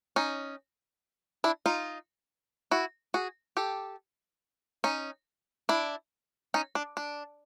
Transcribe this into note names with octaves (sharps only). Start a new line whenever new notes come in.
C#4 D#4
D4 E4
D#4 F4
E4 F#4
F#4 G#4
G4 A4
C#4 D#4
D4 E4
C#4 D#4
D4
D4